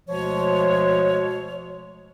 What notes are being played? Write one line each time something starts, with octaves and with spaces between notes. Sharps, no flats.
D2 B2 F3 G#3 C#5